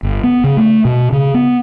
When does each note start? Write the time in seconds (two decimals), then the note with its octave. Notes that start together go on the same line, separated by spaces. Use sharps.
0.03 G1
0.24 B3
0.44 C#3
0.57 A3
0.85 B2
1.12 C#3
1.34 B3